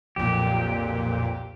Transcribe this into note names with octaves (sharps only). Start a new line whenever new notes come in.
B1 F2 A#2 G4